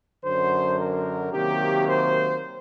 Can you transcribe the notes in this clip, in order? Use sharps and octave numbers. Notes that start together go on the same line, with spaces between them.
F#2 D3 F#3 C5
A#4
C3 D#3 F#3 A#3 G4
C5